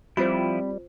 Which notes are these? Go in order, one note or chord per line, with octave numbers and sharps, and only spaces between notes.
F3 G3 C4 E4 F4 C5 B5